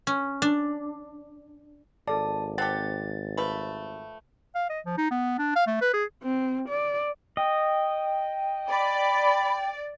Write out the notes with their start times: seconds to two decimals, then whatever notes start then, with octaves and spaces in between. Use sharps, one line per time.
0.07 C#4
0.42 D4
2.08 G#1 A4 D5 A5
2.58 C4 G4 F#5 A5 A6
3.37 F3 A3 B4
4.55 F5
4.69 D#5
4.86 F3
4.98 D#4
5.11 B3
5.38 D4
5.56 F5
5.67 A3
5.81 B4
5.93 G#4
6.23 C4
6.68 D5
7.37 D#5 G5
8.68 D5 B5